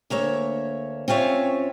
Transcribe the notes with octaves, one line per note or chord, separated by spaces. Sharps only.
D2 A#3 C#5 E5
C4 C#4 F4 C#5 E5